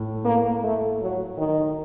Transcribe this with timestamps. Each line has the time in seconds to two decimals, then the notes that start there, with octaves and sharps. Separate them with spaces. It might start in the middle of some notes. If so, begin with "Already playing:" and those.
Already playing: A2
0.25 A#3
0.64 A3
1.01 F#3
1.38 D#3